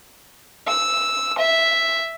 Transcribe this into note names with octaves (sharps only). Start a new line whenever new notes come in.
E6
E5